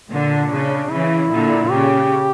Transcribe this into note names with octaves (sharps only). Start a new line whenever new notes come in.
A#2 D3 D4
C#3
C#3 E3 E4
A#2 D3
C#3 G4